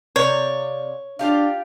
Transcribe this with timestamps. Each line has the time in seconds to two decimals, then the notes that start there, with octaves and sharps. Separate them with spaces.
0.16 C3 C#5 D5 F5
1.19 D4 F4 G4 F5